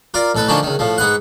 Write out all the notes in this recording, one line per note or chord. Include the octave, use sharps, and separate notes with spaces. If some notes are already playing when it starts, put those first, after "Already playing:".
F4 A#4 D5
A1 A4 B4
D3 D#3 F3 C#4 D4
C#2 D#3
A2 F3
G#2 B3 F#5